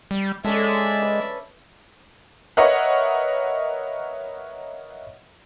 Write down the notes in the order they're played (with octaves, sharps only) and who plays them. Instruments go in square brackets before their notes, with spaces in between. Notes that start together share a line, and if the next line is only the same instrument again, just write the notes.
[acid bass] G3
[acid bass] G#3 [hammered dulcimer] C#4 A4 [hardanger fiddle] D5 E5
[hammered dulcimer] B4
[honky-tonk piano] A#4 B4 C#5 D#5 E5 F#5